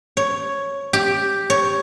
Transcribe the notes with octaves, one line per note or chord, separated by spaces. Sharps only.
C#5
G4
C#5